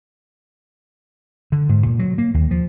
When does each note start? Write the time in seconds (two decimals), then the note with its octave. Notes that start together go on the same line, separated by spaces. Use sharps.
1.52 D3
1.69 G#2
1.86 A#2
1.99 F#3
2.18 A#3
2.34 D#2
2.51 F3